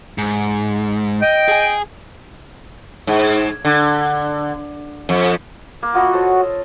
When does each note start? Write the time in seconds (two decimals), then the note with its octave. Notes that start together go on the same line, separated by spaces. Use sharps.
0.18 G#2
1.21 D#5 G5
1.48 G#4 G#5
3.07 G#2
3.65 D3
5.09 F2
5.83 A#3
5.94 F4 F#4 D#5 B5
6.13 A4 C5 C#5